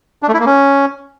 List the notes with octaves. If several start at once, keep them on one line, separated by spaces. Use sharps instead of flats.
D4
A3
E4
A#3
C#4